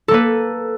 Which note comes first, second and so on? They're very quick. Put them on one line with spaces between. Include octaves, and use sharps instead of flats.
A4 A#3 B4